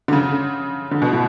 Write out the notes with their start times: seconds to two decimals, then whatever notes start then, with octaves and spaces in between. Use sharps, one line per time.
0.08 D3
0.13 C#3
0.91 D3
1.02 B2
1.12 A2